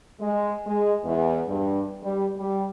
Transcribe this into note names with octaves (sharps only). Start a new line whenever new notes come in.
G#3
G#3
E2
G2
G3
G3